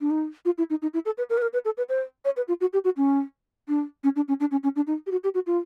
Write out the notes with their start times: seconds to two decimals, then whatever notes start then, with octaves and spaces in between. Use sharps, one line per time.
0.01 D4
0.10 D#4
0.45 F4
0.58 E4
0.70 D#4
0.82 D#4
0.94 E4
1.05 A4
1.18 B4
1.30 A#4
1.37 B4
1.42 A#4
1.53 B4
1.65 A4
1.77 B4
1.89 C5
2.25 C#5
2.36 B4
2.48 F4
2.61 F#4
2.73 G4
2.84 F#4
2.97 C#4
3.68 D4
4.04 C#4
4.16 D4
4.28 C#4
4.40 D4
4.51 C#4
4.63 C#4
4.76 D4
4.87 D#4
5.06 G4
5.11 F#4
5.24 G4
5.34 F#4
5.47 F4